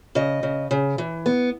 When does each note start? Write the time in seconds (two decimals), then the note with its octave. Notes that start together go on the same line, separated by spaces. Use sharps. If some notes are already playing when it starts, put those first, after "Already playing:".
0.15 C#3 D#5
0.43 C#3
0.71 C#3
0.98 E3
1.26 B3